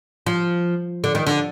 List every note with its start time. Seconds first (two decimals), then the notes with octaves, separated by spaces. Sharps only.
0.26 F3
1.04 D3
1.15 D#3
1.27 D3